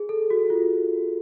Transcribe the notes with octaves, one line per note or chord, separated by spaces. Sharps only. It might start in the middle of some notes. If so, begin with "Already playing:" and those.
Already playing: G#4
A4
F#4
F4